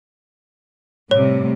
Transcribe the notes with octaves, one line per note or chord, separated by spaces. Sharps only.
A2 C3 G3 C#5